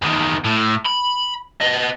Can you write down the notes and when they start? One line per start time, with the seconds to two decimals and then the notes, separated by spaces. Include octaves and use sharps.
0.02 E2 D#3
0.44 A2
0.85 B5
1.62 B3 D#5